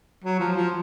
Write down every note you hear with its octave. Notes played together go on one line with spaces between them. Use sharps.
F#3
F3
F3